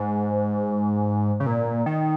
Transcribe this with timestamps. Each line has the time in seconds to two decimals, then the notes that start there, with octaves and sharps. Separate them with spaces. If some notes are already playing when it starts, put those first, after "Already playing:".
Already playing: G#2
1.40 C#3
1.46 A#2
1.86 D#3